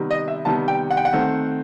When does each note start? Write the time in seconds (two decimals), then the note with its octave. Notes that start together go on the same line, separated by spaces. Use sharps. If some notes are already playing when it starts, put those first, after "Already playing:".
Already playing: C3 D#3 G3 B3
0.11 D#5
0.28 E5
0.45 C3 D#3 G3 B3 A5
0.68 G5
0.91 F#5
0.97 G5
1.05 F#5
1.13 D#3 A3 C4